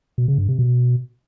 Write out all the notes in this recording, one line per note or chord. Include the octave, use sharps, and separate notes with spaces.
B2
C#3
G2
C3
B2